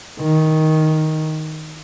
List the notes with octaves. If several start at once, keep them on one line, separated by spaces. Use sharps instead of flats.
D#3